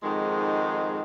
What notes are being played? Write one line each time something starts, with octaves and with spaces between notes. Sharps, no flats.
F2 G#2 D#3 G#3